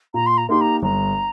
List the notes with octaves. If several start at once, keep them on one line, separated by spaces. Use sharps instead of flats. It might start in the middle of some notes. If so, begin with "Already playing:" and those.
A#2 A#5
C6
A#5
A#3 D#4 G4 C6
A#5
G1 A#5